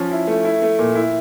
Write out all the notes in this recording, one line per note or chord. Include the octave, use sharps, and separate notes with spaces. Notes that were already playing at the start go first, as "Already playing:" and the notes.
Already playing: F3 C#4
E4
A3
E4
A3
A#2
E4